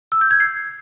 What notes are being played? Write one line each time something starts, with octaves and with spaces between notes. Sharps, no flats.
E6
G6
G#6
C7